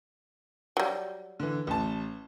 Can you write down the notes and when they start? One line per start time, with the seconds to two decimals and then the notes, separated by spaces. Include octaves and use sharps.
0.77 F#3 G3
1.40 D3 E3
1.67 A1 A5